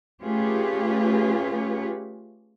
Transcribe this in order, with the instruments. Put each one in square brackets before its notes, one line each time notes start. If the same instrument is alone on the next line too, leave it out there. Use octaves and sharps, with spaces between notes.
[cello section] A3 C#4 F4 G4 G#4 B4